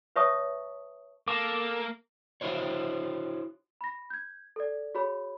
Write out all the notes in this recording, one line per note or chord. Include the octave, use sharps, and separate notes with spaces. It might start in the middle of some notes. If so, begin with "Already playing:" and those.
B4 C#5 E5 A5 C#6 D#6
A#3 A4 A5 D6
E4 F#4 C5 C#5
B5 A#6
G6 G#6
A4 D5
F#4 G#4 C#5 B5